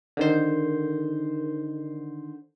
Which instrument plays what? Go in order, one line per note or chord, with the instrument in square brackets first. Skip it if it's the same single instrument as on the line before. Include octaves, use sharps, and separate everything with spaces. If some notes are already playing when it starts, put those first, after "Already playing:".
[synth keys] D3 D#3 C5